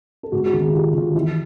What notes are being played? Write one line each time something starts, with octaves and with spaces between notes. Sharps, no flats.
A4
G#2 F#4 G#4
F#4 G#4
D#3
F#4 G#4
D#3 F4 G4
D#3 F4
E3 E4